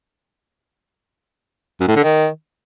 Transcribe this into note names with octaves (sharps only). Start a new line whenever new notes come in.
F#2
A2
D3
D#3